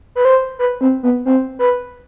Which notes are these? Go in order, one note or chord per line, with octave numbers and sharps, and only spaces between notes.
B4
C5
B4
C4
B3
C4
B4